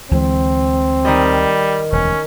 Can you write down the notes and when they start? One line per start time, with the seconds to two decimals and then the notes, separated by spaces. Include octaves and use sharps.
0.11 D2 E3 G#3 C4
1.05 D#3 G3 D#5
1.92 E1 D2 C#4